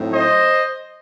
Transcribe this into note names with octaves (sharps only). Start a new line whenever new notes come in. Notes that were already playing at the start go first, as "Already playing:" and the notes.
Already playing: A2 F#3 A3 C4 D#4
C5 D#5